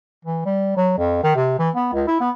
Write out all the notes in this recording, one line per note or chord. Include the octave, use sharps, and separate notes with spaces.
E3
G3
F#3
F2
D#3
C3
E3
B3
C#2
E4
B3